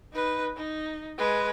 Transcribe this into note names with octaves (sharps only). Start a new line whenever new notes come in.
D#4 B4
D#4
G#3 B4